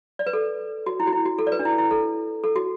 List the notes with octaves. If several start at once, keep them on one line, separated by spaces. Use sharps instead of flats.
D5
B4
A4
F#4
E4
F#4
E4
F#4
A4
D5
B4
D4
E4
E4
A4
A4
F#4